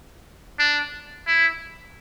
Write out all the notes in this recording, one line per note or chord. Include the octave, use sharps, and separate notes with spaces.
D4
E4